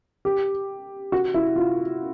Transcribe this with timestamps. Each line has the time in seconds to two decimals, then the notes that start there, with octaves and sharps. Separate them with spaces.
0.25 G4
1.12 F#4
1.34 E4
1.56 F4